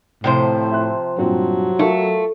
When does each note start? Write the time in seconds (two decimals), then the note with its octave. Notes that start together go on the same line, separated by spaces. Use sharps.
0.24 A2 C3 F3 C5
0.71 E5 F#6
1.18 G2 A#2 F#3 C4
1.79 A3 F4 A#4 C#6